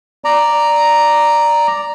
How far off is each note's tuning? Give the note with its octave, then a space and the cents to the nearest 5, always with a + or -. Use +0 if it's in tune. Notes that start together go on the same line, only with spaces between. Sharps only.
D5 +0 A#5 +0